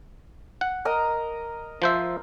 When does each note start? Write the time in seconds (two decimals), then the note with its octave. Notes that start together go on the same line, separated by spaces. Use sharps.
0.61 F#5
0.85 A#4 D#5 A#5
1.82 F3 C5 E5